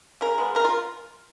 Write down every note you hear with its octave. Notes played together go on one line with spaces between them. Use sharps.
C#3 A#4
G#3 B3
C#3 A#4
F4